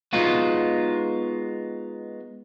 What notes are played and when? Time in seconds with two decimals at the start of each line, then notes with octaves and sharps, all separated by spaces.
0.13 G#3 B3 D#4 F4 F#4